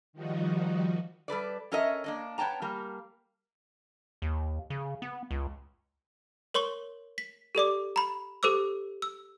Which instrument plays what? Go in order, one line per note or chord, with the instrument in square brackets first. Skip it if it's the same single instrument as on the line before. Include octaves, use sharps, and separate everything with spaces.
[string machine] D#3 F3 G3 D#4 F#4
[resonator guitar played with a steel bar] G3 A4 B4 D5
C#4 A4 A#4 C#5 D#5 E5
A#3 D4 D#5
B3 C#5 G5 A5 A#5
G3 A#3
[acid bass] D#2
C#3
B3
C#2
[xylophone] A#4 C#5 C6 C#6 G7
B6
G4 A4 D5 D6
A#5 B5
G4 A4 C5 D6 E6
E6